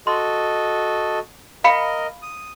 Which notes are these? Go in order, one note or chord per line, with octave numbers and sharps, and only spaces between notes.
F#4 A4 D#5 C6
A#4 D#5 F5 B5 C#7
D#6